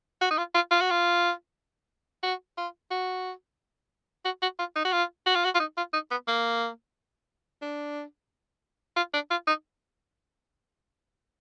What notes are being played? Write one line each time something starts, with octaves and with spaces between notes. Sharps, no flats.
F#4
D#4
F4
F4
F4
F#4
F4
F#4
F4
F#4
F#4
F#4
F4
D#4
F#4
F4
F#4
F4
F#4
F4
D#4
F4
D#4
B3
A#3
D4
F4
D4
F4
D#4